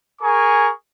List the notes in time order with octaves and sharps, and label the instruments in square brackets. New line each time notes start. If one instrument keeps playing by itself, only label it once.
[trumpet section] G#4 A#4 G#5 C#6